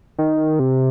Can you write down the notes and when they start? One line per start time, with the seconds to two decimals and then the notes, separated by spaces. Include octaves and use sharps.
0.18 D#3
0.59 C3